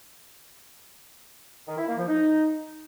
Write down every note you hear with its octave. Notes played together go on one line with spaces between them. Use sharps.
D#3
E4
A#3
F3
D#4